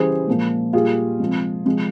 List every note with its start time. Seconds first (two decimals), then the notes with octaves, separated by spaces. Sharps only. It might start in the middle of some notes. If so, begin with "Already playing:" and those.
Already playing: C#3 E3 G3 G#4 C5
0.27 A#2 F3 G#3
0.73 A#2 G3 F4 G#4
1.20 C3 F3 G#3
1.66 C3 F3 G#3